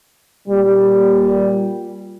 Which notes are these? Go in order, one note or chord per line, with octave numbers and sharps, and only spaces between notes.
A#2 G3